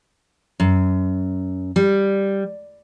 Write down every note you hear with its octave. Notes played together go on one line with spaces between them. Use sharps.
F#2
G3